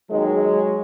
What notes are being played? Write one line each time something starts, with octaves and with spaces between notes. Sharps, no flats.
D#2 D#3 F#3 G#3